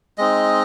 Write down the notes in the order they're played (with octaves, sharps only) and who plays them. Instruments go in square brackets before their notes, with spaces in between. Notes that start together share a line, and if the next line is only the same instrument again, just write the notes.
[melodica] G#3 C4 D#4 D#5